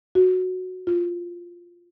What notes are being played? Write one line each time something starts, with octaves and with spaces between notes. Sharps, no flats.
F#4
F4